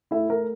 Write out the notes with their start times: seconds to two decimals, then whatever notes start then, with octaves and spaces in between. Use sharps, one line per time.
0.11 A3 E4 E5
0.29 A3 A#4